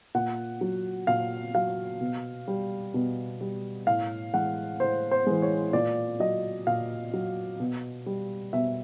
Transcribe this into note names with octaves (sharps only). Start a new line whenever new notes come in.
A#2 F#5
F#3
A#2 F5
F#3 F5
B2
G3
B2
G3
A2 F5
E3 G#3 F#5
A2 C5
C5
E3 G#3
C#5
A#2 D5
F#3 D#5
A#2 F5
F#3
B2
G3
B2 E5